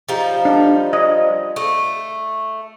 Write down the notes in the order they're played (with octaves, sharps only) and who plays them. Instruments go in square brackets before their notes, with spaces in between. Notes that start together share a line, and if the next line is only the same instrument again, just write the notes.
[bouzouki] F3 G3 D#4
[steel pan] D4
D#5
[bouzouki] A3